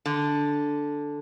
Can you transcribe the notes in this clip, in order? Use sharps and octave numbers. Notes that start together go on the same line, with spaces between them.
D3